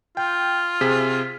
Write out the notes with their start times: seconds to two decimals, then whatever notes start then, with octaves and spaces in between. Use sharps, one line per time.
0.17 F4 G5
0.81 C3 G#4 B6